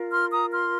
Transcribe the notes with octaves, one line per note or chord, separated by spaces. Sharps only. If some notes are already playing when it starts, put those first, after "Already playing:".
Already playing: F4 A#4
C6 F6
A#5 D#6
C6 F6